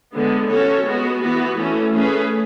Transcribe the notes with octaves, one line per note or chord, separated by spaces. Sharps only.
D3 G#3 B3
C#4 F#4 A4 C#5
G#3 B3 F#4
E3 B3 F#4 B4
E3 A3 C#4
A3 C#4 G#4 B4